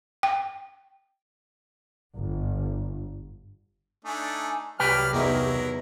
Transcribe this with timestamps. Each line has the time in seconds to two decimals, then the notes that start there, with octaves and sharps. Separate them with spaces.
0.23 G5
2.15 G1
4.05 A3 D4 D#4 G#5
4.80 C2 F#3 G4 B4 D5 G5 F6
5.13 E2 D#3 F#3 E4 A#4